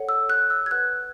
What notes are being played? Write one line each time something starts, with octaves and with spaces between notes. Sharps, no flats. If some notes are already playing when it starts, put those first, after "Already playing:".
Already playing: A4 C#5 F#5
E6
F#6
E6
G#6
B4 F#5 F#6